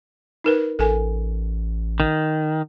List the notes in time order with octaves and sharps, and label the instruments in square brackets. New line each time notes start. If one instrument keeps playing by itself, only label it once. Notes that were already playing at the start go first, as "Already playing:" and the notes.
[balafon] D#4 A#4 B4
[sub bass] A1 [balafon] A4 A#4 G#5
[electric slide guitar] D#3